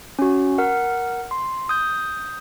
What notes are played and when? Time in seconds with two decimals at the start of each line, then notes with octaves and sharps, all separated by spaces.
0.19 C#4 F#4
0.58 A#4 F#5
1.31 C6
1.69 D#6 G6